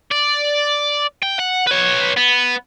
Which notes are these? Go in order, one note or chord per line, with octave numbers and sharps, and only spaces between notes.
D5
G5
F#5
B4 C#5
B3